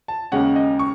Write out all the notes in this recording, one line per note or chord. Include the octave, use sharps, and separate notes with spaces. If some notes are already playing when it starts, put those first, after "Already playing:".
A5
D#2 C#3 G#3 C#4 F#5
D#5
C#6